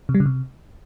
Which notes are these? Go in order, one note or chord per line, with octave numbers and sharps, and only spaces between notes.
C3
G3
C#3
C3